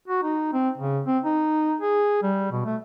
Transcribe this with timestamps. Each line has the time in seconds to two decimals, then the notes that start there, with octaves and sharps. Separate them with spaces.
0.08 F#4
0.23 D#4
0.53 C4
0.78 C#3
1.06 C4
1.24 D#4
1.81 G#4
2.23 G3
2.51 B2
2.66 A3